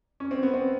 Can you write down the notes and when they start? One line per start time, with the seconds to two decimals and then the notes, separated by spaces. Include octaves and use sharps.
0.20 C#4
0.31 C4
0.43 B3
0.53 C4